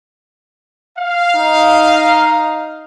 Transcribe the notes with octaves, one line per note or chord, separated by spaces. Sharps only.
F5
D#4